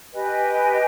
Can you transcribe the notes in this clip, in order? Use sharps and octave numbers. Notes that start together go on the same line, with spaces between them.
G4 B4 D#5 G#5